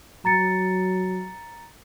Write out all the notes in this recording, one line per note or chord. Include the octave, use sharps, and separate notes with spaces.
F#3 A#5 A6 C#7